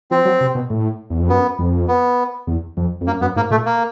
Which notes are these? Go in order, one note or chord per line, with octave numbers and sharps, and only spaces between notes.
F3 C4
F#3
C3
B2
A2
E2
F2
F#2 B3
F2
B3
E2
F2
F2
F#2 A#3
F#2 B3
G#2 A#3
A#2 A3
A#3